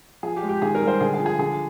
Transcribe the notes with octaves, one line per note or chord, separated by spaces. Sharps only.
F3 G#4
G4
G#3
G4
D#3 G#4
A#4
G3
C5
D3 G#4
G#4
F3
G#4
D3 G#4